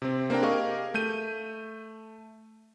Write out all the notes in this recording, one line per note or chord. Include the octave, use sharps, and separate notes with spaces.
C3 C4
A#3 C4 D4 A#4 G5
G4 G#4 A#4 D#5 F5 C#6
A3 G6 D#7